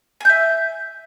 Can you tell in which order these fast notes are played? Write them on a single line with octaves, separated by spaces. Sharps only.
G#5 G6 E5